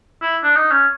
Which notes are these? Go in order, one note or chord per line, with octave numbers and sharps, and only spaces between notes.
E4
D4
D#4
C#4